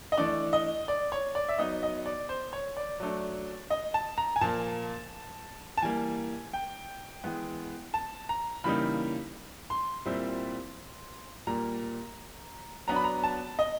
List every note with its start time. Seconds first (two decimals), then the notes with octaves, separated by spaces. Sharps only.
0.12 D#5
0.18 E3 A3 D4 D5
0.53 D#5
0.88 D5
1.12 C#5
1.35 D5
1.49 E5
1.58 F#3 B3 D#4 D#5
1.83 D#5
2.06 D5
2.29 C5
2.53 C#5
2.77 D5
3.00 F#3 A3 D4
3.70 D#5
3.94 A5
4.18 A#5
4.36 G#5
4.41 A#2 F3 A#3 A5
5.78 A5
5.82 E3 G3 A#3 G#5
6.53 G5
7.24 E3 G#3 B3
7.94 A5
8.29 A#5
8.64 C#3 E3 G3 A#3 D#4 B5
9.70 C6
10.06 A#2 G3 C4 E4
11.47 A#2 G3 A#3 A#5
12.88 F#3 B3 D4 A#5
12.96 B5
13.04 A#5
13.24 A5
13.59 D#5